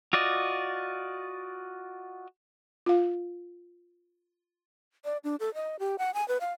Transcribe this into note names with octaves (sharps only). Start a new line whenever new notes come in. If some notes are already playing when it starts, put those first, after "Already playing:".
F4 F#4 D5 D#5
F4 F5
D5
D4
A4
D#5
G4
F#5
G#5
B4
F5